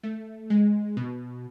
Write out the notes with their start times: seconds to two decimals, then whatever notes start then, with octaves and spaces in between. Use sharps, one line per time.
0.03 A3
0.50 G#3
0.97 B2